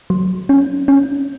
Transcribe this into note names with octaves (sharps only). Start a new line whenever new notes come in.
F#3
C#4
C#4